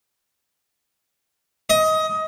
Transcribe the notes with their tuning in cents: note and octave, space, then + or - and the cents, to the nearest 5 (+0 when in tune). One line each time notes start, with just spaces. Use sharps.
D#5 +20